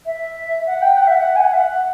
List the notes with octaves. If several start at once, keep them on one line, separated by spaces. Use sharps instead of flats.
E5
F#5
G5
F#5
E5
F#5
G#5
F#5
E5
F#5